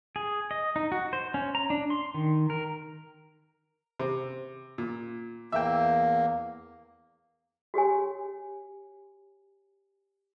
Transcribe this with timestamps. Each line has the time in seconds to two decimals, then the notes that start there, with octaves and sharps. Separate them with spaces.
0.16 G#4
0.51 D#5
0.76 D#4
0.92 F#4
1.13 C5
1.34 C#4
1.55 A#5
1.70 D4
1.90 C6
2.14 D#3
2.50 A#4
3.99 C3
4.78 A#2
5.52 E2 A#3 E5 G5
7.74 F#4 G4 C#5 G#5